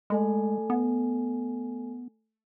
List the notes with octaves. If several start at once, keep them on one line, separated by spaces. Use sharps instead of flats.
G#3 A3 A4 G#5
B3